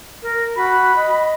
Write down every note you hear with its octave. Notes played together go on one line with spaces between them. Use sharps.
A#4
F#4 B5
D#5